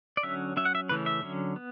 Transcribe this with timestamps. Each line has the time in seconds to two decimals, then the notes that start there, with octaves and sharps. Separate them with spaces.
0.17 D5
0.23 D3 F#3 C#4 E5
0.57 F#3 C#4 E5
0.65 F#5
0.75 E5
0.89 C#3 E3 A3 C#4 B4
1.06 E5
1.23 D3 F#3 C#4
1.56 B3